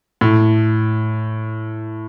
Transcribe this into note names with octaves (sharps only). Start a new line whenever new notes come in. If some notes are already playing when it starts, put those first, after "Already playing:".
A2